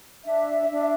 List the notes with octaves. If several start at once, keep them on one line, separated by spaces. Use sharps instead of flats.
D4 E5
D4